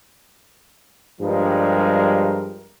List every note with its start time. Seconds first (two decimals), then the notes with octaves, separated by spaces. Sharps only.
1.21 G2 F3 G3 G#3 A#4